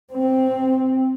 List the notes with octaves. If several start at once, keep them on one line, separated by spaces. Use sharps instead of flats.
C4